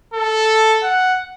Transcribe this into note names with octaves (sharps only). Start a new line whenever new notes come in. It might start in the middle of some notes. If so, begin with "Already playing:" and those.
A4
F#5